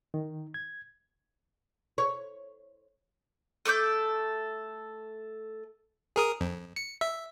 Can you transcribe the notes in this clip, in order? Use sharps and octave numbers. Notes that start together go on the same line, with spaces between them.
D#3
G#6
C#5
A3 A4 D6 G6
G#4 A#4 D#6
F2
C#7
E5